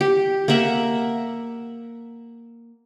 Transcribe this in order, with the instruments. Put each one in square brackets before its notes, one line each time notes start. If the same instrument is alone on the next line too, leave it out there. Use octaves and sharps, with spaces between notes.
[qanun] G4
A#3 A#4 E5 F#5